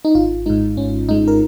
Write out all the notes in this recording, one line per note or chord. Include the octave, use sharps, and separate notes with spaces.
D#4
G#1 F4
G#2 G#3 D#4
G#1 C#4
G#2 G#3 D#4
A#4